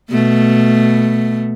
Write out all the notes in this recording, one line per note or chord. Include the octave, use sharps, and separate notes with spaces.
B2 A3